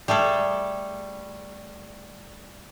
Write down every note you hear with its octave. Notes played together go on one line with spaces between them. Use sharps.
G3 A3 G#4 A4